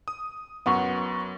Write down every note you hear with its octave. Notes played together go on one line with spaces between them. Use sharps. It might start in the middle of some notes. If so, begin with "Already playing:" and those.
D#6
F#2 B3 F#5 C#6